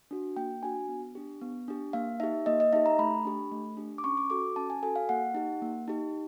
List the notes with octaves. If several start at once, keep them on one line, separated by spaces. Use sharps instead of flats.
D4 F#4
A#3 G5
D4 F#4 G#5
B3
D4 G4
B3
D4 G4
A#3 F5
D#4 G4 E5
A#3 D#5
D#5
D#4 G4 E5
A#5
A3 B5
D4 G4
A3
D4 G4
D6
C#4 C#6
D6
F#4 A4 D6
C#4 A5
G#5
F#4 A4 G#5
F5
A#3 F#5
D#4 G4
A#3
D#4 G4